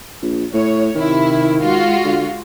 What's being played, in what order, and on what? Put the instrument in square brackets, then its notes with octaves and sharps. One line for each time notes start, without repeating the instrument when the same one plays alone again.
[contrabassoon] A#1
[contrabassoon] A2 [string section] C#5
[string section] C3 E4 [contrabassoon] D#3
[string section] G#3 F4 F#4
[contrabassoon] D3